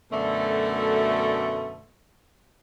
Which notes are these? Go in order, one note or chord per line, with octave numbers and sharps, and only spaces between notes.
F#2 B2 D3 A3